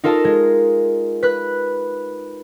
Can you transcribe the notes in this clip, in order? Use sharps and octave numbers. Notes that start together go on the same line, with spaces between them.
D#4 F4 A4 A#4 A5
G#3
B4 F#6